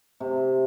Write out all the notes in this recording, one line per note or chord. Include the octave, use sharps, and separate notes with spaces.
C3